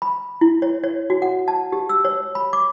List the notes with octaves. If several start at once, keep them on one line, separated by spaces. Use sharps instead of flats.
B5
E4
C#5
C#5
F#4
F#5
A5
G4
E6
C#5
B5
D6